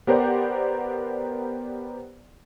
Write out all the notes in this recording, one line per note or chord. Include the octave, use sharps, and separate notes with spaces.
B3 G4 A#4 C5 D5 F#5